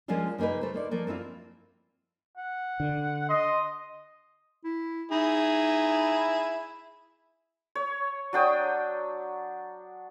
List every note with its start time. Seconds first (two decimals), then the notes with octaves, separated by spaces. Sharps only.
0.08 F3 G#3 A#3 C#4 D4 F4
0.38 C#3 A#3 D#4 G#4 B4
0.61 A3 C5
0.74 A#3 D#4 D5
0.91 F3 A3 A#3
1.07 C4 D4 E4 F4
2.37 F#5
2.80 D3
3.29 D#5 C6
4.64 E4
5.11 D#4 E4 G#4
7.75 C#5
8.33 F#3 D4 G5 D#6